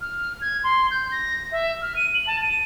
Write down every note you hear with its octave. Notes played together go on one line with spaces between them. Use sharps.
F6
G#6
C6
G6
A#6
E5
F6
D#7
F#7
A5
D#7